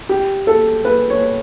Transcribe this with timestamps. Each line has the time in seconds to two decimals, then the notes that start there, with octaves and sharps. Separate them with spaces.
0.09 G4
0.47 A4
0.85 B4
1.10 C#5